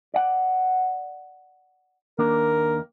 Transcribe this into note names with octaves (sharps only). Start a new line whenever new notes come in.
D5 F#5
D#2 A#3 D4 A#4